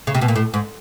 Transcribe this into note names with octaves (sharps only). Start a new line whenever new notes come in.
C#3
C3
B2
A#2
A2
G#2